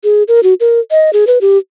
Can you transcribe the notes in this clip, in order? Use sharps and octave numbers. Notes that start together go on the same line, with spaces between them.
G#4
A#4
F#4
A#4
D#5
G#4
B4
G4